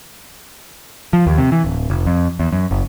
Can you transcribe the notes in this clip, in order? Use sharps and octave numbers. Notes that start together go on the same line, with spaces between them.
F3
D#2
C3
E3
D1
F1
F2
E2
F#2
F#1